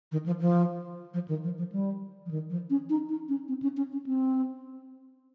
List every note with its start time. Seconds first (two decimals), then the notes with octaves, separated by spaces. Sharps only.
0.12 D#3
0.26 F3
0.41 F3
1.14 F3
1.28 D#3
1.44 F3
1.58 F3
1.72 G3
2.26 F3
2.31 D#3
2.50 F3
2.70 C#4
2.90 D#4
3.09 D#4
3.29 C#4
3.48 C4
3.62 C#4
3.77 C#4
3.92 C#4
4.07 C4